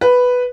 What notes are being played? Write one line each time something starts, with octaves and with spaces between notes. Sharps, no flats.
B4